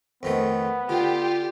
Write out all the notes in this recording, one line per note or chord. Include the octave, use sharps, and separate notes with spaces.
F2 D#3 A3 B3
D3 F4 G4